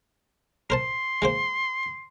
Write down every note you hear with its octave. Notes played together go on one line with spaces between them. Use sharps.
A#4 C5 A5 C6
G#3 A#3 C5